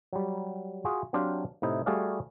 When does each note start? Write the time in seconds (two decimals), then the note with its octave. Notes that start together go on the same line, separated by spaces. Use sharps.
0.13 F#3 G3
0.85 F4 F#4 G#4
1.13 F#3 C4 D4 G4 C5 F5
1.62 A2 C3 D#4 E4
1.86 G3 A3 F#4 G#4 D5 F5